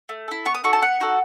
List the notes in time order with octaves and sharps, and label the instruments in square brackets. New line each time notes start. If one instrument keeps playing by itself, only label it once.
[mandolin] A3
E4 A4
B3 C#6
D#6
D#4 F#4 A4 C#6
A5
B3 F#5
D#4 F#4 A4